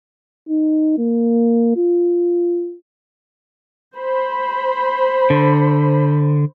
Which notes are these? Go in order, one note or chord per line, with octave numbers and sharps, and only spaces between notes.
D#4
A#3
F4
C5 B5
D3